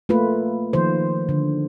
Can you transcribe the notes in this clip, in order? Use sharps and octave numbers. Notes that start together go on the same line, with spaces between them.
A3 A#3 F4 B4
D#3 F3 C5
D3